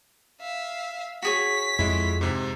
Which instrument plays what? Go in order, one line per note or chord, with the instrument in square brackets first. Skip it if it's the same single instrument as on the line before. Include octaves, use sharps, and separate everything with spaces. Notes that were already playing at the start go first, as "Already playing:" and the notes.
[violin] E5 F5
[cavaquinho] F#4 G#4 C#5 [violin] B6
[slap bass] F2 [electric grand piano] G#3 E4
[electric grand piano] G#2 C3